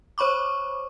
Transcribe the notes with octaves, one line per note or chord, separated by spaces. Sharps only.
C5 C#5 B5 C#6 D6